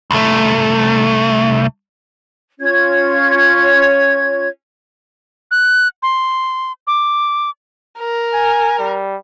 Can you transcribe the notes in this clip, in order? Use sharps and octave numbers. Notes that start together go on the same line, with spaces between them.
C2 A3
C#4 F4 C#5 G#6
F#6
C6
D6
A#4
G#5
G3